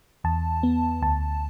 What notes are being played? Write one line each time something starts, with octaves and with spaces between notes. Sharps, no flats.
E2 A5
B3
D2 A5